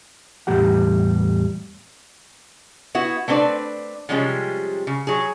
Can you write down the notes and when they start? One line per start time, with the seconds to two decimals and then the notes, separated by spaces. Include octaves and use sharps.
0.47 E2 A2 G3 G4 F#5
2.95 B3 E4 F#4
3.28 A3 B3 C4 D4 B4 D5
4.09 C3 F3 G3 G#3 C#4
4.87 C#3
5.07 F#3 G#4